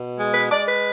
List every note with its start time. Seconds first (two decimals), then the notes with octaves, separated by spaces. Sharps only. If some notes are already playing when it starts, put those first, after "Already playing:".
Already playing: B2
0.17 G#3
0.34 B4
0.51 G#3 D5
0.68 B4